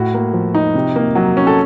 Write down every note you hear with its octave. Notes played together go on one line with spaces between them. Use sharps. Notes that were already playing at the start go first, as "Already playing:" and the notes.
Already playing: A2 F#4
A#3
F3
D#4
C3
A#3
F#3
C#4
A4